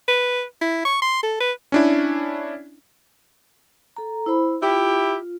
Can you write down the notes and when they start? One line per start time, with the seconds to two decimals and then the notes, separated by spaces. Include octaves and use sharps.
0.08 B4
0.61 E4
0.85 C#6
1.02 C6
1.23 A4
1.40 B4
1.72 C#4 D4 E4
3.97 A4 A#5
4.26 E4 C5 B5
4.62 E4 F4 G4